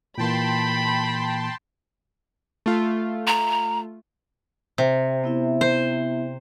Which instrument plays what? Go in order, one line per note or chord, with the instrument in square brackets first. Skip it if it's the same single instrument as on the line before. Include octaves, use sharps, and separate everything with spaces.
[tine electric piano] A#2 E3 A#3 [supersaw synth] G5 A5 C6 [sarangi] B5
[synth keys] A3 F4
[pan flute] A#5
[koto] C3
[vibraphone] B3 E4 E5
[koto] C5